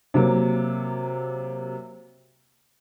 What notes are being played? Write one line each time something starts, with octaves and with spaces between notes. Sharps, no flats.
C3 F#3 A#3